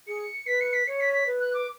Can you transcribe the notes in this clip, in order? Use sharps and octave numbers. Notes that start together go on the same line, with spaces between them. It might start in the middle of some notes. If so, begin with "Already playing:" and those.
G#4 C#7
B4 B6
C#7
B6
C#5 C#7
B6
B6
B4
F#6
D6